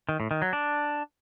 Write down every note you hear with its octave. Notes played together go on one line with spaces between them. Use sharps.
D#3
A2
D#3
F#3
D4